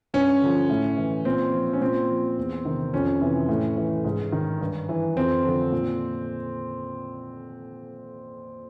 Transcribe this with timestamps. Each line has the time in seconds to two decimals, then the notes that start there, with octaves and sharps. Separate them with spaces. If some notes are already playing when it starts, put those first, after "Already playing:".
0.14 G2 C#4
0.42 D3 F3
0.70 A2
0.97 E3
1.25 A#2 C4
1.53 F3
1.73 C#4
1.81 A#2 C4
2.10 F3
2.38 E2
2.65 C3 D#3
2.93 F2 C#4
3.21 C3 E3
3.49 A2
3.78 E3
4.04 G#2
4.32 D#3
4.61 G2
4.89 E3
5.16 F2 C4
5.44 D3 F3
5.72 A#2